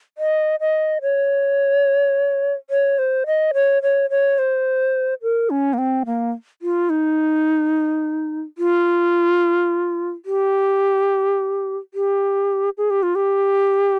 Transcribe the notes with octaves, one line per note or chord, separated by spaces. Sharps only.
D#5
D#5
C#5
C#5
C5
D#5
C#5
C#5
C#5
C5
A#4
C#4
A#3
C4
A#3
F4
D#4
F4
G4
G4
G#4
G4
F4
G4